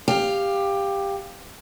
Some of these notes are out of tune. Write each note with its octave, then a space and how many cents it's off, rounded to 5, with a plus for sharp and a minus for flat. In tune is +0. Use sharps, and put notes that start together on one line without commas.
G4 +15 F5 +0